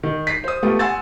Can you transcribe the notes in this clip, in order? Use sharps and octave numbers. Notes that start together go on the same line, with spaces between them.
D#3
B6 C7
C5 D#6
A3 B3 F4 G4
F#5 G#5 C6 E6 A6